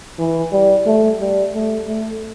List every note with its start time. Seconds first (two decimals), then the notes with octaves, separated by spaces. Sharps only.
0.18 E3
0.52 G3
0.86 A3
1.20 G3
1.53 A3
1.87 A3